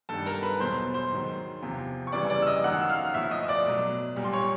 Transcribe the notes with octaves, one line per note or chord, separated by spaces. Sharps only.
G2 D#3 G3 A4 A5
A#4 A#5
B4 B5
E2 B2 F#3 C5 C6
C5 C6
G#2 D#3 F#3
E2 C3 F3
C#6
F#2 C#3 E3 G3 D5 D6
D5 D6
E6
D#5 D#6
F#2 D#3 F#3 F#5 F#6
E6
F5 F6
A2 F3 E5 E6
D#5 D#6
D5 D6
B2 F#3
A#2 G3
C6
C#5 C#6